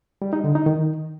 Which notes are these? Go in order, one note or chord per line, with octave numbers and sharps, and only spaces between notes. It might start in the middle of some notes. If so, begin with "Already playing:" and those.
G3
D#4
D3
D#4
D#3